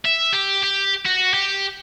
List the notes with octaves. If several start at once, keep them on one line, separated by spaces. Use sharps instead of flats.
E5
G4
G4
F#4
G4